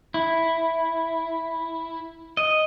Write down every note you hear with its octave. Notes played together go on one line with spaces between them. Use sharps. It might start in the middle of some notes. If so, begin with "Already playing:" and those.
E4
D#5